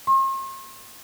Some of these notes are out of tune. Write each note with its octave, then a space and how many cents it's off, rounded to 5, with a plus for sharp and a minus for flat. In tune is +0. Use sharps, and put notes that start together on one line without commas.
C6 +45